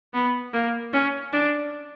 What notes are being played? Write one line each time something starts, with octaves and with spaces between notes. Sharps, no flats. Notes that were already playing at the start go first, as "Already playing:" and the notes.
B3
A#3
C#4
D4